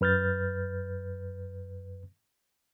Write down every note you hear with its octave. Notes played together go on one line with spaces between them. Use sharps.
F#2 B4 F6 G6 A6